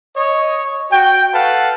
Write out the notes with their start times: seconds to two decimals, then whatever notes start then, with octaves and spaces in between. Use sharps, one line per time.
0.15 C#5 D#5
0.91 F#4 G5
1.33 A4 B4 F5 F#5 A5